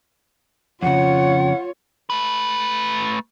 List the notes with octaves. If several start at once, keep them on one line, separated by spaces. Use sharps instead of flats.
F2 C#3 F4 C#5 F#5
A3 B4